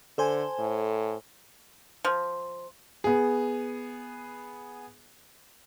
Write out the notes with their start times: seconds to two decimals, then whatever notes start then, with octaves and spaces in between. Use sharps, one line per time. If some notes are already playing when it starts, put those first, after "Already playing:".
0.18 D3 A4 C5 G#5
0.59 A2
2.05 F3
3.04 B3 G#4